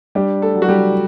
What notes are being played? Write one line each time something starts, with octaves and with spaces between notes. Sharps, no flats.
G3 D4 G4
A3 A4
F#3
F#4
G3 G4